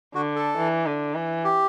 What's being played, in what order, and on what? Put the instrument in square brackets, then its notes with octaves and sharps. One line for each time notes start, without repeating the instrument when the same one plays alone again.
[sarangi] D3 [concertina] F#4
[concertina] A4
[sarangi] E3
D3
E3
[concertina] G4